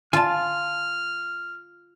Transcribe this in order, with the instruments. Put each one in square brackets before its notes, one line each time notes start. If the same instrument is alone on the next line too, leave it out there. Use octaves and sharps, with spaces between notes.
[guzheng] F4 [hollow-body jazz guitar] G#5 A5 [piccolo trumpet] F6